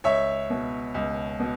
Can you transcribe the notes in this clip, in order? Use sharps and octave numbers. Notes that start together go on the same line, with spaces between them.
C#2 C#5 E5
B2
C#2
B2